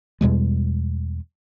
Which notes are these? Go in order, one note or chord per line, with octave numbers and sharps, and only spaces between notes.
E2 B2 G3 G#3